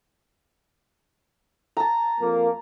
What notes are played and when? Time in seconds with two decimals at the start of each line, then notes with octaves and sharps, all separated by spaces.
1.77 A5 A#5
2.20 F2 A#3